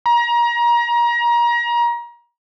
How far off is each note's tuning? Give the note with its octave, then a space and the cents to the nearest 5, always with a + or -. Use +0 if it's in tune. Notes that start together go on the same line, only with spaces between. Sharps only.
A#5 +30